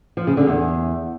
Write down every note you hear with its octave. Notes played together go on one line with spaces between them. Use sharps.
F3
C#3
D3
E2